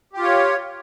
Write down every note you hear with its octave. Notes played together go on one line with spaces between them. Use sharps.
F4 G4 C#5